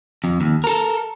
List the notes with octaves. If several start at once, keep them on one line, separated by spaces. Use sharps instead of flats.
F2
D#2
A4 A#4